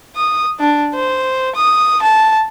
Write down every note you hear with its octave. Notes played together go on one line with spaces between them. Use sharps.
D#6
D4
C5
D#6
A5